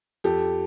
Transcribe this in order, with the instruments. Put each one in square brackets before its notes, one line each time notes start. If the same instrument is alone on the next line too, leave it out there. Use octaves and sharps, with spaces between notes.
[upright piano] F2 G4 A4